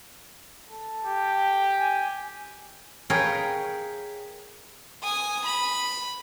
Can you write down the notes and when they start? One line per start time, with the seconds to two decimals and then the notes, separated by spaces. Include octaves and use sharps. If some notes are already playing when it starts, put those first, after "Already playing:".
0.70 A4
1.05 G4
1.79 G#5
3.10 G#4 A#4 B4 C#5 F5 G5
5.03 G#5 D#6
5.46 B5